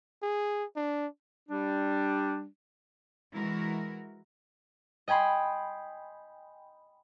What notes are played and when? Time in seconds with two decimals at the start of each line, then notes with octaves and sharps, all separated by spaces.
0.22 G#4
0.76 D4
1.49 G3 D4
3.34 E3 G#3 E4 F#4 A#4
5.08 D#5 G5 G#5 B5 C6